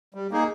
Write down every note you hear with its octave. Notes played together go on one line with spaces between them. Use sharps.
G3
A#3 D#4 G#4